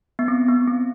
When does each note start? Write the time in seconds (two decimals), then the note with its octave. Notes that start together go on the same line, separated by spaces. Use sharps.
0.19 B3
0.28 C4
0.48 B3
0.68 C4